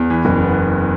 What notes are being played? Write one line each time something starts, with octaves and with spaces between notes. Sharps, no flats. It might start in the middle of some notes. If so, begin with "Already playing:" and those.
Already playing: E2
E3
F#1
B3